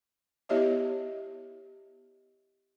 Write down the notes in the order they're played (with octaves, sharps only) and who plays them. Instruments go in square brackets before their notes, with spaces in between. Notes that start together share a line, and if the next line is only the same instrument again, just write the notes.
[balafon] B3 E4 G4 C#5 D#5 E5